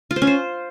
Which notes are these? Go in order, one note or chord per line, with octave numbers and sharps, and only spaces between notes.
F4
C5
C#4
C5